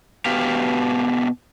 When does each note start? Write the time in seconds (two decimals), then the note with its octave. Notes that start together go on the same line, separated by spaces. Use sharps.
0.26 B2 B3 G4 F5